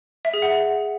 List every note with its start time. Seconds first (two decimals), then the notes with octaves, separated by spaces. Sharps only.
0.25 E5
0.34 G#4
0.42 F#5